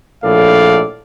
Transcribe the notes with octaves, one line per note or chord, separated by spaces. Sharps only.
A#1 A2 A4 D5 F5